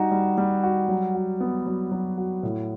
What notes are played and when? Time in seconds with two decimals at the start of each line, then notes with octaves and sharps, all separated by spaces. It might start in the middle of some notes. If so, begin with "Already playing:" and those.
Already playing: G3 D#4 F#4
0.11 G3
0.38 G3
0.63 F#4
0.89 F#3
1.14 F#4
1.40 B3
1.66 F#3
1.92 F#3
2.18 F#4
2.43 A2